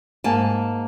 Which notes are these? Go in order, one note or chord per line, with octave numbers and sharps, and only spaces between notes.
G#2 A#3 G#5 A5